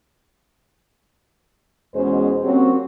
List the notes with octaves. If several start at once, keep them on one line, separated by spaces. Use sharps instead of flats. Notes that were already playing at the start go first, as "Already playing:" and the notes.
E2 B2 G#3 C#4 C5
F#3 A#3 C4 C#4 F#4 G4